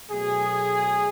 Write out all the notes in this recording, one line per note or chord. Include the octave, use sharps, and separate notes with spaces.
B2 F#3 A3 G#4